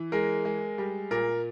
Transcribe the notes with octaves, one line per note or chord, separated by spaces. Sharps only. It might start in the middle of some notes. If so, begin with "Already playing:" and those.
Already playing: E3
G#3 A#4
G#3
G3
A#2 A#4